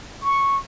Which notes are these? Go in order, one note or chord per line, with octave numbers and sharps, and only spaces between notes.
C#6